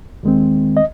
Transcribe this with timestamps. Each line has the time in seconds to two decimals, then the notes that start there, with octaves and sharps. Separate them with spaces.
0.23 D#2 D#3 G#3 C4
0.77 D#5